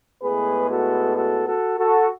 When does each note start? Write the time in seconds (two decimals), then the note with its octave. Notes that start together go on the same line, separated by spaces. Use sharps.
0.21 A2 G#3 B3 G#4 B4
0.69 F#4 A4
1.16 F#4 A4
1.47 F#4 A4
1.78 F#4 A4